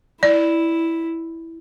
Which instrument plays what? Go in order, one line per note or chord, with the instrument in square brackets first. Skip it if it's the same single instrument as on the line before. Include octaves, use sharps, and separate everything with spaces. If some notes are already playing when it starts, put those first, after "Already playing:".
[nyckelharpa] E4 [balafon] D5